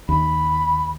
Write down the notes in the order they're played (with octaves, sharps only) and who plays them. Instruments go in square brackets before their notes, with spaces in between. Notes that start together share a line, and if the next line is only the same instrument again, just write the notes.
[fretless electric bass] D#2 [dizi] B5